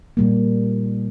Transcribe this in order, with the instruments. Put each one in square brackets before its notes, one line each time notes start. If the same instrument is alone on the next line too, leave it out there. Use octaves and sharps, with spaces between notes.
[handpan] A#2 G3 A#3